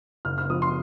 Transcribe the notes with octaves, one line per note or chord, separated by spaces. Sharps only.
F#1 F6
F6
F3 D#6
C6